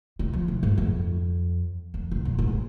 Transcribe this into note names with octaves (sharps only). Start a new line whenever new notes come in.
C3
F3
C3
G#2
F2
F2
C3
A#2
G#2